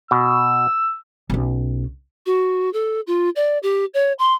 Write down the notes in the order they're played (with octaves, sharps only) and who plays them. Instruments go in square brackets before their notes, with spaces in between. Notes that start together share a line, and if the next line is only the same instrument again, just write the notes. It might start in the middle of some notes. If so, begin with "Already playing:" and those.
[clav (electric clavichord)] B2 [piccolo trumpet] E6
[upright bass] B1 C#4
[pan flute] F#4
A4
F4
D5
G4
C#5
C6